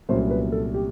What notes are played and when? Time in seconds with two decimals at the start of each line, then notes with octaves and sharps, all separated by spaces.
0.09 C2 A#2 F#3 A3 C#4 C5
0.30 B4
0.52 A4
0.74 G4